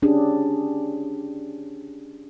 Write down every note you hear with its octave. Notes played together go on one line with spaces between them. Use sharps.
C#4 D4 G4 G#4